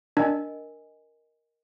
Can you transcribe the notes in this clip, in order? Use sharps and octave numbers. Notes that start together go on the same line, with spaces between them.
D4 A#4 D#5 G#5